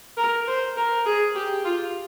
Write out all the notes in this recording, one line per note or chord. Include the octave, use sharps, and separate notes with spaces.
A#4
C5
A#4
G#4
G4
F4